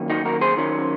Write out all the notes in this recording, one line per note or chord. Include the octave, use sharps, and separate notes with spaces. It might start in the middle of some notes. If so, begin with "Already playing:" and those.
Already playing: D#3 F#3 A#3 C#4
D#4 F#4
F#4 A#4
G#4 C5
D#3 F#3 C#4